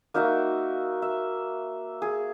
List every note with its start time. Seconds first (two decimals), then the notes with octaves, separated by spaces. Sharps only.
0.14 A#3 D#4 F#4 E5
1.02 E5
2.02 G#4